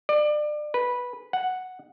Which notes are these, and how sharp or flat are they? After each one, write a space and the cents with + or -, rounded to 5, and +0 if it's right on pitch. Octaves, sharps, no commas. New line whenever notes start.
D5 +30
B4 -10
F#5 +0